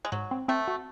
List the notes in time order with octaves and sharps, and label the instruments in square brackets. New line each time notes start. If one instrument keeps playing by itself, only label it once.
[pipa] G#3
[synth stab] G#2 [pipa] F#3
[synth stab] C4
[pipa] A3 [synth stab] C4
[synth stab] F#4